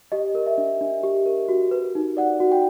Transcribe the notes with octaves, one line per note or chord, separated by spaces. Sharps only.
G4 D#5
A#4
E5
D4
D4
G4
A#4
F#4
B4
D#4
D5 F#5
F#4
G5